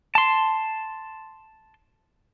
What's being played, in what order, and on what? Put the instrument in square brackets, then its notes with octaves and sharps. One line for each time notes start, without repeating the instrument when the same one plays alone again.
[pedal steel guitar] A5 C6